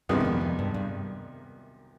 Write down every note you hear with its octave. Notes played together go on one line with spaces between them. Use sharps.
C2 G2 C3 D#3 G#3 B3
G2
F2
F2
G2
G2